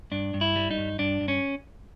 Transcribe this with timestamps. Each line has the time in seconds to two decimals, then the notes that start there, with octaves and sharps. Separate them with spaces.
0.11 G2 D4
0.34 G2
0.41 E4
0.56 G3
0.71 D#4
0.78 G2
0.99 G2 D4
1.21 G2
1.28 C#4